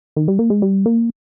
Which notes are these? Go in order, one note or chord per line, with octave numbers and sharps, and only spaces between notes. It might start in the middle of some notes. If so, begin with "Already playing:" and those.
D#3
G3
A#3
G#3
G3
A#3